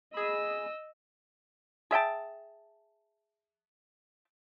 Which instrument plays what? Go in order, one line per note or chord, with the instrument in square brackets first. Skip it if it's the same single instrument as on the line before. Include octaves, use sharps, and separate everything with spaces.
[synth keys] G#4 B5 [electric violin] D#5 E6
[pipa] G#4 E5 G5 A5